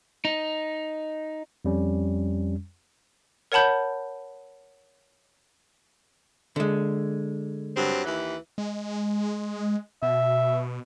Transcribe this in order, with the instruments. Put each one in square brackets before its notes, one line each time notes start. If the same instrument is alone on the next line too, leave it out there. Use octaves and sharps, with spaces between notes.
[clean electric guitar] D#4
[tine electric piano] F2 G3 C#4
[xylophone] A#4 C#5 F#5 A5 B5 G6
[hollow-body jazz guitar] D3 G#3
[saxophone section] G2 F#3 C4
D#2 E3
[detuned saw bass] G#3
[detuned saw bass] B2 [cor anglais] E5